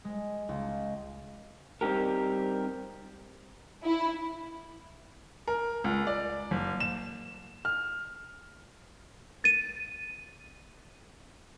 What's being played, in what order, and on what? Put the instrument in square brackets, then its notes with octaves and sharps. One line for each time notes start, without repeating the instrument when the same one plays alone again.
[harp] G#3
C#2
[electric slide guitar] G3 C4 D#4 G4 A#4
[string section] E4
[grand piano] A#4
C#2
D5
F#1
E7
F6
[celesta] A6 D#7